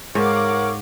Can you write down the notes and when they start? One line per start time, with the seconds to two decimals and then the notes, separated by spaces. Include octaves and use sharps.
0.15 G#2 A#4 C#5 F5 F#5 D6